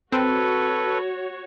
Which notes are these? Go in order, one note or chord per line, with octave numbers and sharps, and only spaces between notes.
C4 F#4 A4 B4 C#5